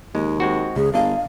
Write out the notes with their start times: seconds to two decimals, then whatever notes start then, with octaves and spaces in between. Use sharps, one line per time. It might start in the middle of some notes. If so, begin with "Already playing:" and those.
0.15 D#2 G#3
0.40 G#3 C4 F#4
0.76 C#2 G#4
0.94 G1 D4 D#5 F5